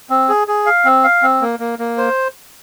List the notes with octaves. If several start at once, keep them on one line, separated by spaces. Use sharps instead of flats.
C4
G#4
G#4
F5
C4
F5
C4
A#3
A#3
A#3
C5